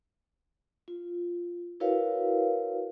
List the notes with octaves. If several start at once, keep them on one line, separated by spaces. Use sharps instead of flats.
F4
E4 F#4 A#4 B4 C#5 F5